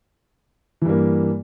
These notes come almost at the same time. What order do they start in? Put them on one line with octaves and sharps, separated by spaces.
E3 G2 A#3